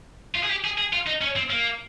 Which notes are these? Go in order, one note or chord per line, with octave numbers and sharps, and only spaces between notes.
F4
G#4
G4
G#4
G#4
F4
D#4
C#4
C4
A#3